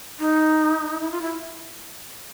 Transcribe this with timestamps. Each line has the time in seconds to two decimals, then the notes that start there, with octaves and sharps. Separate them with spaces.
0.19 D#4
1.01 E4
1.11 F4
1.21 E4